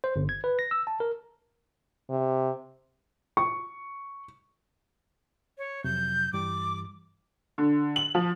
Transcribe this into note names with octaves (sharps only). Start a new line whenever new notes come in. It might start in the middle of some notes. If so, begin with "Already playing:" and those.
C5
G1
G#6
B4
A#6
E6
A5
A#4
C3
C#6
C#5
F2 C3 F#3 G6
G2 E3 G3 D6
D3
F#7
F3